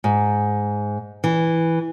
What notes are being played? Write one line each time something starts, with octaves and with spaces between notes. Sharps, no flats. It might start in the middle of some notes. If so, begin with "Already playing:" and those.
G#2
E3